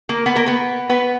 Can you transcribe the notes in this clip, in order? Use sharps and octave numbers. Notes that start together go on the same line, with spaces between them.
A#3 A#4
B3 B4
A#3 A#4
B3 B4
B3 B4